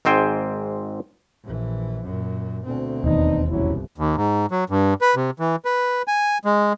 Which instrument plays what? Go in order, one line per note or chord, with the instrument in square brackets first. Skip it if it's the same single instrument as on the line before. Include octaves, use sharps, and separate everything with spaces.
[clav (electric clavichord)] G#1 G#2 C4 C5 G5 G#5
[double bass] A#1 E3
F#2 A#2
[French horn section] D2 [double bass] B2 C4
[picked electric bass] E1 D#2 [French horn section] B3 D4 D#4
[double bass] G1 C2 [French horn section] F#3 C#4 E4
[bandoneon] D#2
G#2
F#3
G2
B4
C3
E3
B4
G#5
G#3